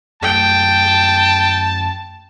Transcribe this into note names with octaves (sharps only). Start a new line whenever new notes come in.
F#2 A3 G5 A5